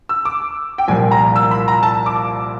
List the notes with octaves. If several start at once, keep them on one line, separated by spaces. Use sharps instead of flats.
E6
D6
G5
C2 A#2 F3 A#3 G#5
A#5
E6
B5
A#5
A5
D6